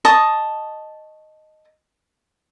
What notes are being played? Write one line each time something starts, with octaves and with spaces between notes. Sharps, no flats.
D#5 A5 C#6 D#6